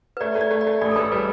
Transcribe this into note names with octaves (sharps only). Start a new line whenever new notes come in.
B4
A3 D5
A3
D5
A3
D5
A3
A1 D5
A4
A1 B4
G3 B4